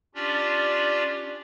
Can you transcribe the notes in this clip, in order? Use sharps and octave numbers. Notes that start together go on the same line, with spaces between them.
C#4 D4 F4 G4 D5